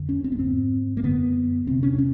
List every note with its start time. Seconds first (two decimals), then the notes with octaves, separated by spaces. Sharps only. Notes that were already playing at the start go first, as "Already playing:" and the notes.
Already playing: F2 D3
0.09 C#4
0.24 C4
0.32 B3
0.39 G#2 C4
0.97 A#3
1.03 F#2 D3 B3
1.66 E2 C3 C4
1.83 C#4
1.94 D4
1.98 C#4